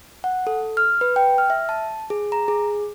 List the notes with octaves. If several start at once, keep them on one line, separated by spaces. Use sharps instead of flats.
F#5
A4
F6
B4
G5
F6
E5
A5
G#4
A#5
G#4